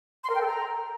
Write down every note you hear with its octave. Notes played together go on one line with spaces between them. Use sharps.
C6
A#4
G5
A4
A#5